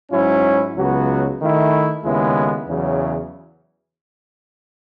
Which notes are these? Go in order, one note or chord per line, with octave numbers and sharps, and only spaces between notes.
G#2 F#3 C#4 E4
C#2 C#3 F#3 B3 F#4
D#3 A3 E4
D#2 C#3 G#3 B3 E4
E2 C#3 F#3